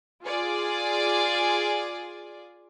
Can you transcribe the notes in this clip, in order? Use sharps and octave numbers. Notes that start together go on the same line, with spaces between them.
F4 G#4 D5